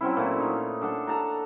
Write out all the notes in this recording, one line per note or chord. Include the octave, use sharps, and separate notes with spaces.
F#3 C4 C#4 E4
A#2 A3 F#4
D#4 F4 C#5
D4 A4 F#5 A5
A4 A5 A#5